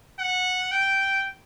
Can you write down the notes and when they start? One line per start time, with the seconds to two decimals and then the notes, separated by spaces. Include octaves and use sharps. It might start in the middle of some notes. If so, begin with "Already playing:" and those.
0.19 F#5
0.71 G5